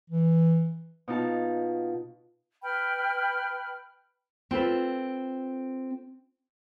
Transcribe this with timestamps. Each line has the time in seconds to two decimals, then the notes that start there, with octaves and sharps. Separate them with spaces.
0.10 E3
1.08 B2 D#4 F4 A5
2.63 B4 G5 B5 F6
4.51 C4 F4 A4 B4